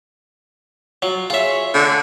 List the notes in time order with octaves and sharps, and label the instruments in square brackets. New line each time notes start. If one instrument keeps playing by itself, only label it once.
[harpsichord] F#3 [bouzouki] F4
[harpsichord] F4 E5 [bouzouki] G#4 C#5
[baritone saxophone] D3 [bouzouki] A3 D4 G#4